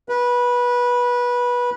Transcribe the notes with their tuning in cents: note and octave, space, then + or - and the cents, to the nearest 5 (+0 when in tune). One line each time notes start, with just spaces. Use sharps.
B4 -20